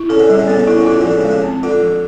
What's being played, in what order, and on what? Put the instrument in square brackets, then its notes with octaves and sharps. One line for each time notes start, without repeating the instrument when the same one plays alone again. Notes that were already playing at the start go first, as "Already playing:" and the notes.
Already playing: [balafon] E4
[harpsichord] C#3 [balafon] A4
[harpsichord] D3
[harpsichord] C#3 [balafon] G3
[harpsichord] D3
[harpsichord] C#3 [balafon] B3
[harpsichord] D3
[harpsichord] C#3 [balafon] E4
[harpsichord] D3
[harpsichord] C#3 [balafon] F4
[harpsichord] D3 [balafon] F3
[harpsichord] C#3
[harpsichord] D3 [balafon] G#3
[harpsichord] C#3
[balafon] C4
[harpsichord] D3 [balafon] F4
[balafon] F3